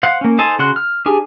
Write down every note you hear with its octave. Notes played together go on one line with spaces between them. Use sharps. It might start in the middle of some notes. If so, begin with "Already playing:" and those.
C5 F5 F#5
A#3 C#4
D#4 A4 C5 G#5 A5
C#3 F#4 C6 F#6
F6
D4 G4 G#4 G#5